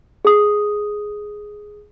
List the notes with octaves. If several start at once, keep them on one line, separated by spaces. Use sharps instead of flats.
G#4 D#6